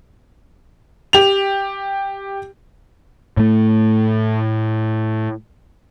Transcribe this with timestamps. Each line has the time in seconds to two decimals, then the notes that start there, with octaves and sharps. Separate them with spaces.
1.13 G4 F7
3.37 A2 A3